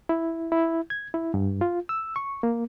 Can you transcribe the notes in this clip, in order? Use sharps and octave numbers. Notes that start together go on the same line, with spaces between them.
E4
E4
G#6
E4
G2
F4
E6
C#6
A#3